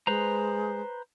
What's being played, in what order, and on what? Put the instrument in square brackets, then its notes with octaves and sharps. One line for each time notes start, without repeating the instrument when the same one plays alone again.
[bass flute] G#3 [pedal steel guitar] B4 C5 A#5